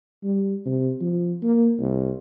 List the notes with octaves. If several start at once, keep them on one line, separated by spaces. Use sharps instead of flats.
G3
C3
F3
A#3
C2